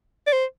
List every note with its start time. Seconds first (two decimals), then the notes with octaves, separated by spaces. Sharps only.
0.27 D5
0.33 C5